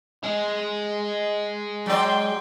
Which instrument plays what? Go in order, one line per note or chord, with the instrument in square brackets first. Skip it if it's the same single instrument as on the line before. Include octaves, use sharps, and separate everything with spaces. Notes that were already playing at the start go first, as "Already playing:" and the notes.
[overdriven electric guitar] G#3 G#4
[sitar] F#3 D5 [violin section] G5 C6